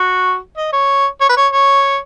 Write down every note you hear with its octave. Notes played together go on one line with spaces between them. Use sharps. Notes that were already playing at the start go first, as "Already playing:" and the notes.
Already playing: F#4
D#5
C#5
C#5
B4
C#5
C#5